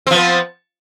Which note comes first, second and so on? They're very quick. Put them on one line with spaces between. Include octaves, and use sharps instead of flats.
C4 F3 B3